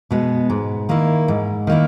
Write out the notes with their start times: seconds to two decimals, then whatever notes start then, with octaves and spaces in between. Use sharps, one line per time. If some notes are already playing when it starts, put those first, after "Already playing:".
0.11 B2 G#3 B3
0.50 G#2
0.89 D#3 A#3 E4
1.28 G#2
1.67 D#3 A#3 E4